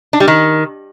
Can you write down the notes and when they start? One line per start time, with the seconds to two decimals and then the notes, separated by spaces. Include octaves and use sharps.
0.13 D4
0.20 G3
0.28 D#3